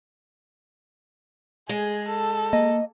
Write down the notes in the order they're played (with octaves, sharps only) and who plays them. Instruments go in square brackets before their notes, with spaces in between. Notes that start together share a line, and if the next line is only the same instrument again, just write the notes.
[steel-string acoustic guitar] G#3 [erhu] G#4
[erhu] A4
[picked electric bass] A#3 [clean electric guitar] D#5